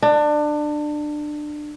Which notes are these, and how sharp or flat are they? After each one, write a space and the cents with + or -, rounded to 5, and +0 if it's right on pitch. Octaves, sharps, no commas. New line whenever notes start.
D4 +25